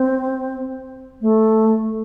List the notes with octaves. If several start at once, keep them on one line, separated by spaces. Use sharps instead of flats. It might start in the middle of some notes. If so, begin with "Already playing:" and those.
Already playing: C4
A3